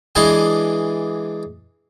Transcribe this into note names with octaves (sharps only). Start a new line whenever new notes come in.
E3 G#3 D4 D#5 G#5 C6